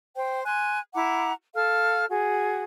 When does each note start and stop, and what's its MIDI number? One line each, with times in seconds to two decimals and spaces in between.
0.16 0.43 72
0.16 0.43 79
0.45 0.79 80
0.45 0.79 84
0.45 0.79 90
0.94 1.32 64
0.94 1.32 78
0.94 1.32 82
0.94 1.32 86
1.55 2.05 69
1.55 2.05 77
1.55 2.05 89
2.09 2.64 66
2.09 2.64 68